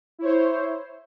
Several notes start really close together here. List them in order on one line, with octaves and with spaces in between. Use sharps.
E4 C#5 C5